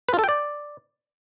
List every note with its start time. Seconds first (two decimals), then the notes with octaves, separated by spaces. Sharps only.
0.09 B4
0.14 F4
0.19 A4
0.24 G5
0.29 D5